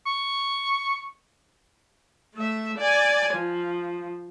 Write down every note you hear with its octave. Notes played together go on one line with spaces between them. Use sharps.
C#6
A3 E5
D5 G#5
F3